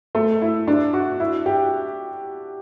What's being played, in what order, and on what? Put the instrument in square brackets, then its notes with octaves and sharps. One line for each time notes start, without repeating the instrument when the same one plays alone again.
[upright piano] A3
E4
D4
F#4
E4
G4